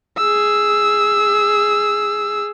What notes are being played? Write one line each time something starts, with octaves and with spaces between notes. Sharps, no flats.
G#4 E6